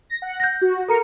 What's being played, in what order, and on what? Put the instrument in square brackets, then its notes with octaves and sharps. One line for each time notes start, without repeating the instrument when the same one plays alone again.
[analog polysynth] A#6
F#5
[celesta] G6 A#6
[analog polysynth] F#4
[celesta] A4 A#5 C#7 [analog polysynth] A#4